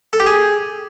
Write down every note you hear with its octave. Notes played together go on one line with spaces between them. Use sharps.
A4
G4
G#4